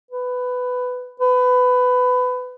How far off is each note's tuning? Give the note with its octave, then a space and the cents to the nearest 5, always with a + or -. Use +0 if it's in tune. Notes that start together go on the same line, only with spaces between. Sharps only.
B4 +15
B4 +20